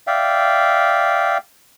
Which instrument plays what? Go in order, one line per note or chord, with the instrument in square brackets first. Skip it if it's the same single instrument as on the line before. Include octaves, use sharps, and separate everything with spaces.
[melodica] D5 E5 F5 G5